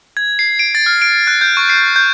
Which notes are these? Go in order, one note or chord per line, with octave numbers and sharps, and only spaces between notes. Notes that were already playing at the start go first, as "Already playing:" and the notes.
G#6
C7
D7
A6
F6
D7
F#6
G6
C#6
C7
G6